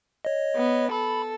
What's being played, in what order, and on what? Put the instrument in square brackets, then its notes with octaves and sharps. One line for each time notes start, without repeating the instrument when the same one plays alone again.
[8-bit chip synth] C#5 D#5
[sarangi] B3
[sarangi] A4 [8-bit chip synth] B5